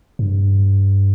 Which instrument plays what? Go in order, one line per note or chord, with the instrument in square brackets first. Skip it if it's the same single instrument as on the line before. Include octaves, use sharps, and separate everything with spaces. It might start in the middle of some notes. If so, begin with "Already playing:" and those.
[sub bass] G2